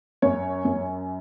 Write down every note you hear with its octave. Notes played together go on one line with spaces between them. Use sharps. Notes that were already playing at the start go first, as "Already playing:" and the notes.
F#2 C#5
F#2